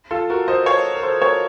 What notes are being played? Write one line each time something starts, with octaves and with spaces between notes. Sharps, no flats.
F4 A4
F#4 A#4
C5 D#5
C#5 F5
A#4
A4 C5
A#4 C#5